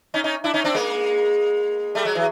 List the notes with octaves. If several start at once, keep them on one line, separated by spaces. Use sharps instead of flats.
C#4 D#4
C#4 D#4
D4 E4
C#4 D#4
C4 D4
G#3 A#3
G3 A3
F#3 G#3
E3 F#3